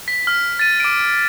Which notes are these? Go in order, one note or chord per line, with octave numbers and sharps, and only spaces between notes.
B6
F6
A6 D#7
D6 D7